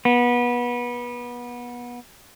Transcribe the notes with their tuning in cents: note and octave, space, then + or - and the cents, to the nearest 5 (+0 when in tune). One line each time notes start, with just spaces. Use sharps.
B3 -25